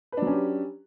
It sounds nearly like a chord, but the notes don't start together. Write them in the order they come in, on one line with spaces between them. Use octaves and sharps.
B4 D4 F#3 C#4 G4